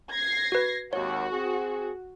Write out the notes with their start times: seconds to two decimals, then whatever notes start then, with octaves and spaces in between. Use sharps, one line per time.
0.11 G#6 A#6 C7
0.52 F#4 B4
0.93 G#1 D#2 F#4 C#5
1.31 C4 G#4